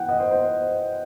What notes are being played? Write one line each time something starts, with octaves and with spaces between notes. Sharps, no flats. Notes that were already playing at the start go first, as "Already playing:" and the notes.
Already playing: E3 F#5 G5
D#5
C5
C5